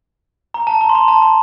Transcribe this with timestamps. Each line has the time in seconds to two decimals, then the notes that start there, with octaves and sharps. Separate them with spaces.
0.54 A#5
0.67 A5
0.81 A#5
0.89 C6
0.95 A#5
1.08 A5
1.22 A#5